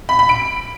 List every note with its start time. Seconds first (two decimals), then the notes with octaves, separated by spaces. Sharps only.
0.09 B5
0.19 B5
0.29 D7